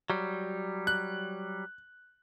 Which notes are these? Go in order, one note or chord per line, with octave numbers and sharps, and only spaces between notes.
F#3 G3
F#6